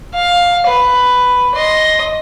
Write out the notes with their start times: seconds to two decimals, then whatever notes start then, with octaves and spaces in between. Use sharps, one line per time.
0.15 F5
0.68 B4
1.55 D#5 C6